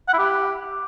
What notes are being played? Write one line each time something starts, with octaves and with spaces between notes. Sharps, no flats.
F#5
E4
G4